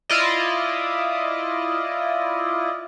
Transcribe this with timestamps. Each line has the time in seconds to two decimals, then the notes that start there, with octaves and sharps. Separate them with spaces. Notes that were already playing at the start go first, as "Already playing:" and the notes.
0.09 E4 F4 D5 D#5